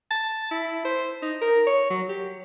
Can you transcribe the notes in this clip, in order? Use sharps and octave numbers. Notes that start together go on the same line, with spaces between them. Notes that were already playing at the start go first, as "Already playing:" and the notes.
A5
E4
C5
D#4
A#4
C#5
F#3
G4